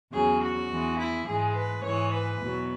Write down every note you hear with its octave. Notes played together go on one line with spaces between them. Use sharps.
E2 C#3 F#3 G#4
F#4
E2 E3 G#3
E4
G#2 E3 G#3 G#4
B4
G#2 E3 G#3 C#5
B4
E2 B2 F#3